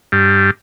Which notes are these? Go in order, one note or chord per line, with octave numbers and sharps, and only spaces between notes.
G2